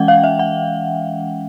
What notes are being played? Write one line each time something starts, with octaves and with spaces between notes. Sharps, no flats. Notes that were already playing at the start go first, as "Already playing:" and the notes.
Already playing: E3 G#3 C#4 F#5 G5
F5
E5
F#5